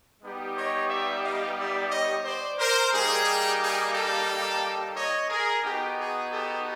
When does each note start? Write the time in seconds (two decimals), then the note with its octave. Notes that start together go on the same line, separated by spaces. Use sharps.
0.22 G3 B3 D#4 G4
0.56 C#5 D#5
0.90 D5 E5
1.23 D#5 F5
1.58 D5 E5
1.90 C#5 D#5
2.24 C5 D5
2.59 A#4 C5
2.92 G3 A#3 D#4 G4 G#4
3.60 G#4
3.94 G4 A4
4.95 C#5 D#5
5.29 G#4 A#4
5.62 B3 D#4 F#4 G4
5.97 G#4
6.30 G4 A4